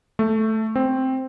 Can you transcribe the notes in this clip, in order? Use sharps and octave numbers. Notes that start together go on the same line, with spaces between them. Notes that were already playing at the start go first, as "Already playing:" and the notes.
A3
C4